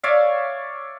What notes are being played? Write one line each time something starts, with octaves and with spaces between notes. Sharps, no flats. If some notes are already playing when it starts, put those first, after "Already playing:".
C#5 D5 E5 F5